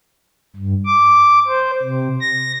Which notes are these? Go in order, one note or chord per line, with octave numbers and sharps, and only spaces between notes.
G2
D6
C5
C3
A#6